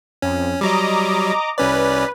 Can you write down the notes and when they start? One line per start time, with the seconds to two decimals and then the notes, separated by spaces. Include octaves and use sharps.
0.22 F2 C#4
0.61 F#3 G3 D#5 A#5 D6
1.58 C2 C#4 B4 D5